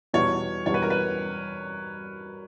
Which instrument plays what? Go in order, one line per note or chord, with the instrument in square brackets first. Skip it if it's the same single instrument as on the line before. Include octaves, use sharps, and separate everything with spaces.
[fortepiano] E2 B2 G3 [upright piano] C#5
[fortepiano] E2 B2 G3 [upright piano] C#5
[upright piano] B4
A#4
B4